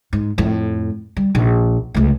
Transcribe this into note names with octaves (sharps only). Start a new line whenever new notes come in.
G#2
F2 A2
G3
A#1
C#2 A3